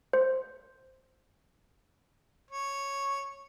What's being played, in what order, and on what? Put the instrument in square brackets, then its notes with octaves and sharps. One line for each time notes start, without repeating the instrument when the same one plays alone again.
[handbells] C5
[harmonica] C#5